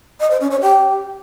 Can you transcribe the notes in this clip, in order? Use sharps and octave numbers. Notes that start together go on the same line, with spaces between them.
D#5
C5
C#4
C#5
G4